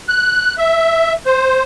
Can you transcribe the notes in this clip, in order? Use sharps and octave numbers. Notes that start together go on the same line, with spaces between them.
F#6
E5
C5